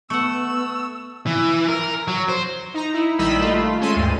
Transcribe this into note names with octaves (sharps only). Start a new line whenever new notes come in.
A3 B3 F#5 C#6 E6
E3
A#4
F#3
C5
D#4 A#5
E4
A#1 D#3 G3 D#5 B5 E6
A3 F4
G#3 C#4 A4 C6 D#7
D2 G2